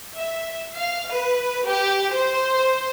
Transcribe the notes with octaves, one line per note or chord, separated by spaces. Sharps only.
E5
F5
B4
G4
C5